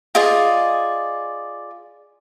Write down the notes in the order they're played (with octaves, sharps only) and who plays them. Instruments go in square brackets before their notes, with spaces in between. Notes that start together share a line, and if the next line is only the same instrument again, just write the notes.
[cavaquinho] F4 G#4 D5 D#5